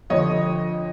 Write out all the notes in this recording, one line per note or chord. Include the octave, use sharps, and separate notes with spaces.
F2 D3 F3 C#5 D#5